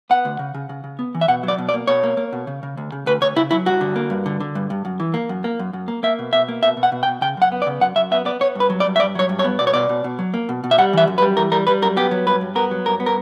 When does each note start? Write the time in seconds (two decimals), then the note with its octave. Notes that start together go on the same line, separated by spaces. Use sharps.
0.10 B3 F#5
0.25 D2
0.39 C#3
0.55 C#3
0.69 C#3
0.84 C#3
0.99 B3
1.15 E3
1.21 E5
1.28 B2 F#5
1.43 F#3 D5
1.58 B2
1.69 D5
1.74 A#3
1.87 B2 C#5
2.03 A#3
2.17 A#3
2.32 B2
2.47 C#3
2.63 C#3
2.77 D2
2.92 C#3
3.06 D2 B4
3.21 D2 C#5
3.36 C#3 E4
3.51 F#3 E4
3.66 G2 F#4
3.81 D3
3.96 A#3
4.10 G2
4.26 D3
4.40 D3
4.55 G2
4.70 G2
4.85 F#2
5.00 E3
5.14 A#3
5.29 F#2
5.44 A#3
5.59 F#2
5.73 F#2
5.88 A#3
6.03 A#3 E5
6.19 B2
6.33 B2 E5
6.48 A#3
6.63 B2 E5
6.77 B2
6.83 F#5
6.92 B2
7.03 G5
7.07 B2
7.21 C#3 G5
7.37 F#2 F#5
7.52 B3
7.62 D5
7.66 C#3
7.81 F#2 F#5
7.96 F#2 E5
8.11 B3 E5
8.25 B3 D5
8.40 B3 C#5
8.55 G2 B4
8.70 F#3
8.80 D5
8.86 G2
8.96 E5
8.99 G2 D5
9.15 F#3 C#5
9.29 G2
9.39 C#5
9.44 B3
9.59 B2 D5
9.67 C#5
9.74 B2 D5
9.89 B2
10.04 B2
10.19 F#3
10.34 A#3
10.49 B2
10.64 B2
10.71 E5
10.78 G3 F#5
10.93 E3 E5
11.07 F#2
11.18 B4
11.22 G3
11.37 E3 A#4
11.52 G3 A#4
11.67 G3 B4
11.82 F#2 A#4
11.96 B3 G4
12.11 F#3
12.27 G2 B4
12.41 G2
12.55 B3 A#4
12.71 F#3
12.86 G2 A#4
13.00 B3
13.06 A#4